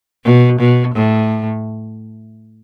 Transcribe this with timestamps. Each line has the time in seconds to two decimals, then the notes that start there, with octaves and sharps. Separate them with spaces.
0.25 B2
0.60 B2
0.95 A2